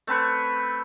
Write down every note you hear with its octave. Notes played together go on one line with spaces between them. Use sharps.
A3 C4 B4 C#5